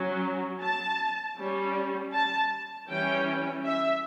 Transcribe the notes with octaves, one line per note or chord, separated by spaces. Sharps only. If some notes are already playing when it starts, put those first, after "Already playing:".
Already playing: F#3 C#4
A5
G3 C#4
A5
E3 G3 C#4 G5
E5